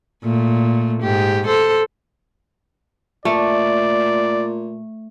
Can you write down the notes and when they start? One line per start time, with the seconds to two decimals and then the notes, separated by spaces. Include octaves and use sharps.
0.24 A#2 A3
1.02 G#2 G4
1.47 A4 C5
3.25 A#2 A3 D5